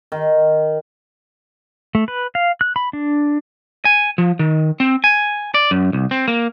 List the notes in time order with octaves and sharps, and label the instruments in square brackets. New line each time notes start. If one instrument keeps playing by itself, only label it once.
[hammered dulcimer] D#3
[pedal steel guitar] A3
B4
F5
F#6
B5
D4
[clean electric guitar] G#5
F3
D#3
C4
G#5
D5
F#2
C2
C4
A#3